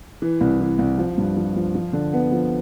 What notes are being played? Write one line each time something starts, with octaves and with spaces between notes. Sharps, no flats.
E3
C2
E3
C2
F3
G2
F3
F3
F3
D3
B3
F3